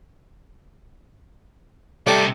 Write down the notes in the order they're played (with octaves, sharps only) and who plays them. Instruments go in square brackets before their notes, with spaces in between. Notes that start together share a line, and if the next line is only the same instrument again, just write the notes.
[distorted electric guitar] C3 D#4 [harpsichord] G3 A3 D5